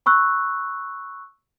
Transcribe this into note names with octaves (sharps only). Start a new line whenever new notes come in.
B5 C#6 E6 F#6